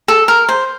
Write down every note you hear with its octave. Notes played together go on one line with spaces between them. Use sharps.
A4
A#4
C5